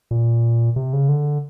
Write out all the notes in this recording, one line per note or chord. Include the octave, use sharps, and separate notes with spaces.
A#2
C3
C#3
D3